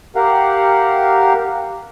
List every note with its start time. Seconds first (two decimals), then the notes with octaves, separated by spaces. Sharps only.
0.16 G4 A#4 F5 F#5